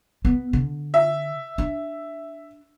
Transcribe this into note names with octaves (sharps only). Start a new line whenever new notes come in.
B3
D3
E5
D4